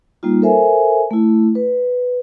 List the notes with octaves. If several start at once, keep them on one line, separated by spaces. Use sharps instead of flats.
G3 A#3 D#4 F4
A4 A#4 C5 E5 G#5
A3 E4
B4